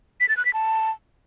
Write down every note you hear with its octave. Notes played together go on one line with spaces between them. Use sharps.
B6
A6
F#6
B6
A5